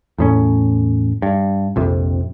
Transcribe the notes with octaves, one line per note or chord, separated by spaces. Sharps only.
E2 A2 C#4
G2
A#1 F2 C3